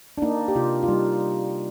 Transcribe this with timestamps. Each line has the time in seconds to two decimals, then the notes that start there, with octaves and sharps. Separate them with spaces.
0.18 D4
0.22 A#3 D#4
0.48 G4
0.55 C3 F4
0.83 F4
0.88 G3 D#4